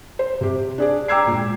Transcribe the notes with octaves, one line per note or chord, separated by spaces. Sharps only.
C5
C3 G4
D4 G#4 D5
G5 A#5 D6 E6 G#6 C7
A#2 G#3